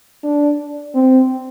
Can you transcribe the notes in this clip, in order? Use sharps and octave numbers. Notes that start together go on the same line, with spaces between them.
D4
C4